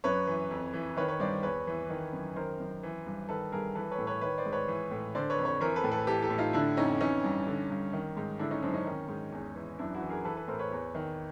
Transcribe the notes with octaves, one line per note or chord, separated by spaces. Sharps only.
F#2 B4 C#5
E3
F2
E3
D#3 B4 C#5
B4 C#5
G2 C5 D5
E2 B4 C#5
E3
D#3
F#2
D#3 A#4 C5
F#2
E3
G2
D#3 A4 B4
G2 G#4 A#4
E3 A4 B4
B4 C#5
A2
B4 C#5
D#3 B4 C#5
C5 D5
G#2
B4 C#5
E3
A2
D3 C5 D5
B4 C#5
F2
B4 C#5
E3 A#4 C5
A4 B4
A2
A4 B4
E3 G4 A4
G4 A4
A2
D#4 F4
D3 D4 E4
F2 C#4 D#4
E3 C#4 D#4
G2
D3
G2
D#3
G#2
D3 D4 E4
C#4 D#4
F#2 C4 D4
C#4 D#4
D#3
G#2
E2
E3
F#2 D4 E4
E4 F#4
E3
G#4 A#4
E3 A4 B4
A4 B4
A2 A#4 C5
B4 C#5
E2
D#3